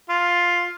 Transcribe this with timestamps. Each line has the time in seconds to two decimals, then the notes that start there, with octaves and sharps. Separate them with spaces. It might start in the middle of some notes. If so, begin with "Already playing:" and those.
0.10 F4